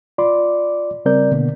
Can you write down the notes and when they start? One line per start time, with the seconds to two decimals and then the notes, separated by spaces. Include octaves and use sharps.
0.18 F4 D5 B5 C6 D6
1.05 C#3 G3 C4 A#4 D5 G6
1.31 B2 D3 A#3 B3